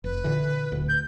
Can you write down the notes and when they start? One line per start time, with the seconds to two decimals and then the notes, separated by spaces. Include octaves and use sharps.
0.04 F1 B4
0.24 A#2 D3 E3
0.72 D1 D2
0.89 G6